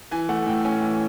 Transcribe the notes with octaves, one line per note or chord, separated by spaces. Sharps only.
E3 G#5
A3 F#5
A2 G5
C#4 G#5
E3